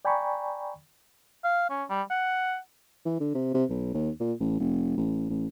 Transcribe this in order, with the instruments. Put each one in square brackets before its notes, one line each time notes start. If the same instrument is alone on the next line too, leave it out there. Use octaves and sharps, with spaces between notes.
[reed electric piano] D5 G5 G#5 A#5 B5 C#6
[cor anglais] F5
C#4
G3
F#5
[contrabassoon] E3
D3
C3
C3
B1
D#2
A#2
A1
F1
A1
A1